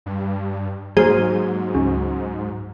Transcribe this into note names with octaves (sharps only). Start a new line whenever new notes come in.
G2
G#2 F#3 A#3 G#4 C5
C#2